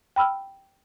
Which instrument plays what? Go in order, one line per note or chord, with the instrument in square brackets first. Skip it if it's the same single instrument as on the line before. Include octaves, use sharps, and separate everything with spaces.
[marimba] G5 B5 E6 F6